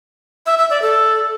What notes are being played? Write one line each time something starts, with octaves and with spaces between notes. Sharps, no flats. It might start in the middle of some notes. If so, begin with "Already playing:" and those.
E5
E5
D5
A4